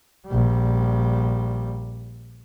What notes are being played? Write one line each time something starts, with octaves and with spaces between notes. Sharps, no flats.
A#1 G3